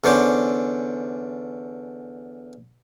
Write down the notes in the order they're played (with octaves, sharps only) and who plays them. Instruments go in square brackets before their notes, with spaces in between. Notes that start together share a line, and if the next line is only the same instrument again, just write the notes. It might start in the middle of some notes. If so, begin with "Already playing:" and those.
[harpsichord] E2 D3 C#4 C5 D6